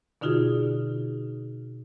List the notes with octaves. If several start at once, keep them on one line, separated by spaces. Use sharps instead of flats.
B2 D3 D#4 F4 F#4 G#4